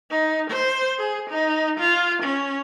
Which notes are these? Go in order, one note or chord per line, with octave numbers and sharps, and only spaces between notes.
D#4
C5
G#4
D#4
F4
C#4